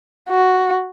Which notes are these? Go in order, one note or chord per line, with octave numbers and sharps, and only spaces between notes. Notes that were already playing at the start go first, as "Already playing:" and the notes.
F#4